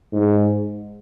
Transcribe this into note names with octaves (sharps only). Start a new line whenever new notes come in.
G#2